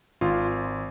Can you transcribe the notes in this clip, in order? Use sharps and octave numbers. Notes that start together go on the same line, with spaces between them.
G#1 F4